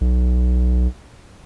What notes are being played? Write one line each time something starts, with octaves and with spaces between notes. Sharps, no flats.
B1